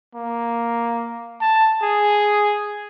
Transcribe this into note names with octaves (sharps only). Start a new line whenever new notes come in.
A#3
A5
G#4